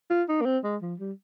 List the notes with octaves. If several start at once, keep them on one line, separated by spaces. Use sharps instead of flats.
F4
D#4
A#3
C4
G#3
F3
G3